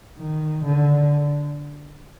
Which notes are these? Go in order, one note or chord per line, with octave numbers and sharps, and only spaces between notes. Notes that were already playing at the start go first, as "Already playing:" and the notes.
D#3
D3